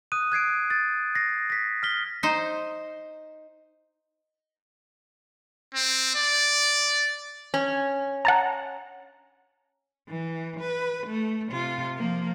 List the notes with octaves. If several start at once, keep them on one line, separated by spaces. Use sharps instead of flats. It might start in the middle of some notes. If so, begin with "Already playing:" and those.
D#6 F#6 D#7
F#6 G#6 C7 D7
A6
A#6 C7
A#6 B6
F6 B6 G7
D#4 C5
C4
D5
C#4
F#5 A5 A#5
E3
B4
A3
C3 F4
F3 A#3